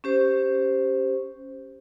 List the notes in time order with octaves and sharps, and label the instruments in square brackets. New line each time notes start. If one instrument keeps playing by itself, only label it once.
[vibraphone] C#4 G4 C5